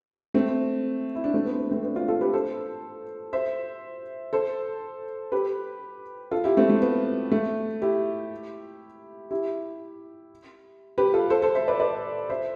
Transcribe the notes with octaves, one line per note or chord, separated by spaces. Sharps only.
A3 C4
E4
D4
A3 C4
B3
B3
A3 C4
B3 D4
D4 F4
F4 A4
G4 B4
A4 C5
C5 E5
A4 C5
G4 B4
F4 A4
E4 G4
A3 C4
A3
B3
A3
E4 G4
E4 G4
G4 B4
F4 A4
A4 C5
A4 C5
C5 E5
B4 D5
B4 D5
C5 E5